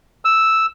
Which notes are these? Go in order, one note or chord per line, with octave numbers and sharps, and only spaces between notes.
E6